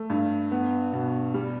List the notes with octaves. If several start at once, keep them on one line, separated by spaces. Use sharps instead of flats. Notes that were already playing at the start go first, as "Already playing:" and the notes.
Already playing: A3
G2
B3
B2
G3